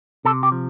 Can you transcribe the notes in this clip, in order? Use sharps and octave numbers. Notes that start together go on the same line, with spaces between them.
C3 A4
G4
F3